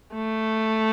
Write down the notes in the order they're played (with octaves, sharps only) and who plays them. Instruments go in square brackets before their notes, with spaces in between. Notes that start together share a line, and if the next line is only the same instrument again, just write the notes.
[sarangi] A3